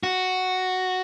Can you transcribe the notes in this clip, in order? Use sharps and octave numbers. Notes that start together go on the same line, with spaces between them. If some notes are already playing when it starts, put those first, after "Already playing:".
F#4